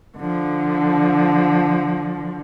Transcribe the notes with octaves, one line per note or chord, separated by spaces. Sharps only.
D3 F3